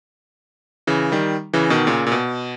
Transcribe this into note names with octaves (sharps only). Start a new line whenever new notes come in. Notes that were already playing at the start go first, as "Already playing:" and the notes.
C#3 E3
D#3 G3
C#3 E3
B2 D#3
A#2 C#3
A#2
B2